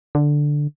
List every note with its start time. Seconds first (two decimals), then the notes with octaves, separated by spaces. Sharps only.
0.15 D3